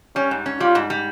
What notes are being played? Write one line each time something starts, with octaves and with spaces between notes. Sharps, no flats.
G3 C#4
G#2
C#4
G3 F4
G#2
G3